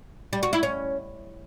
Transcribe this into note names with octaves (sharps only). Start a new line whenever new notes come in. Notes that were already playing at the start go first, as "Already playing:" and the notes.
G3
F#4
E4
C#4